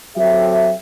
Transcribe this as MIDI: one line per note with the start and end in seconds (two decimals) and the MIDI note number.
0.17 0.73 54
0.17 0.73 60
0.17 0.73 67
0.17 0.73 69
0.17 0.73 76